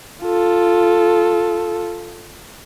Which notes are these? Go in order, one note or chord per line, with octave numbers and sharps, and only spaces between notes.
F4 A4